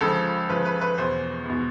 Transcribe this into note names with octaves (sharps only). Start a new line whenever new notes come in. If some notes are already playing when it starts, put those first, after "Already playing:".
C#2 C#3 F3 A4
C#2 C#3 F3 B4
B4
B4
E2 B2 C5
E2 B2